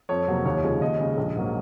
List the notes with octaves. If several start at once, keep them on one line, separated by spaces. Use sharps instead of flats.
F2 C#5
C3 F#3 A#3
D#2 C#5
C#3 F3 G#3
D#2 D#5
C#3 G#3
A#1
G#2 F#3 A#3